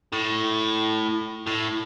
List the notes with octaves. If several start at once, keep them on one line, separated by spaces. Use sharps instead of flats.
A2
A2